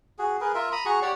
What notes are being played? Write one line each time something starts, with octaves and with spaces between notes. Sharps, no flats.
F#4 G#4
G#4 A#4 B4
F4 A#4 E5
A#5 B5 D#6
F#4 G#4 A#5 C#6
G4 C#5 D5 F#5